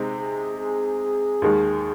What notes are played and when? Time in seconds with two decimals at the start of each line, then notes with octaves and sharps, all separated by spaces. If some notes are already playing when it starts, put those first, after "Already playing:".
Already playing: C3 G#3 C4 D#4
0.16 G#4
0.58 G#4
1.42 D#2 D#3 G#3